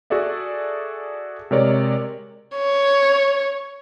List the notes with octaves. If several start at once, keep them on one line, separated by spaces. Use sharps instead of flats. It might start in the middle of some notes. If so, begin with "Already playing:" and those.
F#4 G#4 A4 D5 E5
C3 G#3 A#4 C#5 D5
C#5